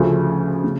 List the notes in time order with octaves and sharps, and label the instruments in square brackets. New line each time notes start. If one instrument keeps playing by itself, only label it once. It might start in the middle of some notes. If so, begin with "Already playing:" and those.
Already playing: [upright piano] D2 C#3 F3 A3
C#3